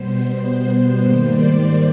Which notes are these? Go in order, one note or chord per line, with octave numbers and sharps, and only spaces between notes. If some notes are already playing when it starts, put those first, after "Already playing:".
Already playing: B2 G3 B3 C5
C5
G#2 D#3 G3 A#3
D5